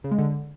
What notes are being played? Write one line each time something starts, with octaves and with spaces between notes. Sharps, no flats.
C#3
G#3
D3